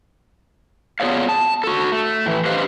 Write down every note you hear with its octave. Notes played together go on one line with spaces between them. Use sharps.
B3 F4 G#4 C#5 D5 F5
A5
F#4 A4
A3
A2 E3
G4 B4 C5 D#5 F5